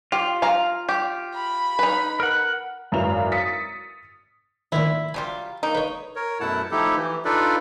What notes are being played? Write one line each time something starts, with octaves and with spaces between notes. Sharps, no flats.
F4 G4
F5 A#5
G4
B5
D#4 B4
A#4 F#5
G#1 F#2 E4 B4 F5 F7
D#6 A6 B6 C#7
A#2 D#3 F3 E4
F#3 G3 F4 G#5
A#3 D#4
B4 C#5
A#4 C#5
F#2 B2 A3 E4 F#5 A5
F3 A3 D#4 E4 G4 A4
E3
D4 D#4 F4 A4 B4 D5